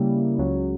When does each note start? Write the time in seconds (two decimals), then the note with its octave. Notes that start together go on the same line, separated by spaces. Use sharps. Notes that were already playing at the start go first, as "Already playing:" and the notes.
Already playing: C#3 G3 A#3 E4
0.38 C#2 C#3 F#3